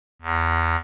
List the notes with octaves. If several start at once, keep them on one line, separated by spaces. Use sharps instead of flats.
E2